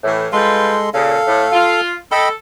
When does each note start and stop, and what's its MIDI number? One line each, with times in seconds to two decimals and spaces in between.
0.04 0.27 45
0.04 0.27 52
0.33 0.74 55
0.33 0.90 56
0.33 0.74 65
0.33 0.90 69
0.33 0.74 71
0.33 0.90 84
0.94 1.17 46
0.94 1.17 49
0.94 1.81 69
0.94 1.81 77
1.27 1.45 45
1.53 1.92 65
2.12 2.32 69
2.12 2.29 75
2.12 2.29 79
2.12 2.29 83